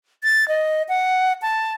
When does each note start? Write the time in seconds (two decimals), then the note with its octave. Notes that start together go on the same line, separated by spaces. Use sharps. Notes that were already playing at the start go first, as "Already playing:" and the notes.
0.24 A6
0.48 D#5
0.89 F#5
1.42 A5